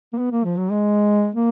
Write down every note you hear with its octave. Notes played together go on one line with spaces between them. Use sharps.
A#3
B3
A#3
F3
F#3
G#3
A#3